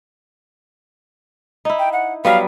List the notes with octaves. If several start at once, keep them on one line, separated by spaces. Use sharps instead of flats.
D#4 E4
G5
F#5
F#3 G3 B3 F5